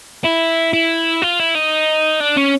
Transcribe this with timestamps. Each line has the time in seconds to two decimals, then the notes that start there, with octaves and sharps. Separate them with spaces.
0.24 E4
0.73 E4
1.22 F4
1.39 E4
1.55 D#4
2.20 D4
2.37 C#4